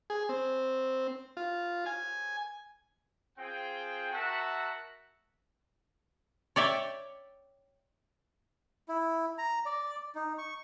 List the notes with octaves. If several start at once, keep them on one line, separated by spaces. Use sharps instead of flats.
G#4
C4
F4
G#5
C4 F4 G#4 G5
F#4 A#4 E5 F#5 A5
C#5 D5 E5 G5
E4
A#5
D5
D#4
C#6